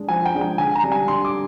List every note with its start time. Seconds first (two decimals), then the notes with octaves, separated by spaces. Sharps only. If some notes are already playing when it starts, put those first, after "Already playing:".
Already playing: G#3 D4
0.09 F3 G#5
0.26 G5
0.34 G#3 D4
0.41 G5
0.58 D3 G#5
0.75 A#5
0.83 G3 D4
0.92 G#5
1.08 D3 C6
1.25 D6